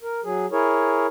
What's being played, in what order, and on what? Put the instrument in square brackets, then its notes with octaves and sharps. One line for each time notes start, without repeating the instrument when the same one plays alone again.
[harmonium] A#4
F#3 G#4
E4 G#4 A#4 C#5